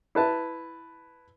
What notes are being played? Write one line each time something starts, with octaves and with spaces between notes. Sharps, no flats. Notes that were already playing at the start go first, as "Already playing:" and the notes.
E4 B4 A5